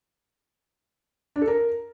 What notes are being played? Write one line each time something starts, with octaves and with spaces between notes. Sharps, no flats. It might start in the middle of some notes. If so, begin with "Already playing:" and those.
D4
A4
A#4